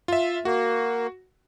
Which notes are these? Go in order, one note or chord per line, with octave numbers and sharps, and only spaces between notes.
F4 E5
A#3 F#4